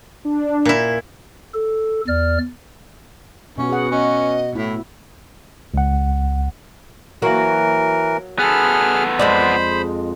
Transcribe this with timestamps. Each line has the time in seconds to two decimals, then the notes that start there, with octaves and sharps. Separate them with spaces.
0.25 D4
0.65 A#2 E4
1.54 A4
2.08 E2 D5 F6
3.58 B2 B3 C#4 F#4
3.69 F#4 G#4 F#5
3.91 C#4 D#5
4.55 A2 E4
5.74 C#2 F#5
7.22 E3 F#3 A#3 F#4 A#4
8.39 B3 G#4 A4 B5 F6
9.19 F2 G#3 C5 D5 B5